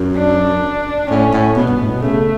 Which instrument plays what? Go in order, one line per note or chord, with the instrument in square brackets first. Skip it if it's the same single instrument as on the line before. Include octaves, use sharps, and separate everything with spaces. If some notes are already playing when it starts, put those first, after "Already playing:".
Already playing: [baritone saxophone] F#2
[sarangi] D4
[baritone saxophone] A2 [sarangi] C#4
[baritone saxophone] A2
[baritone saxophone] B2 [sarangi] B3
[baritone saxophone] G2
A2
B2
[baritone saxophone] C#3 [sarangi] A3